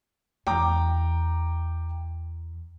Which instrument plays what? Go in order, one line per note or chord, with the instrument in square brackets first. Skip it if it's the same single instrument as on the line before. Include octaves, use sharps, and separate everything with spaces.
[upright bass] E2 [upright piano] G5 A#5 D6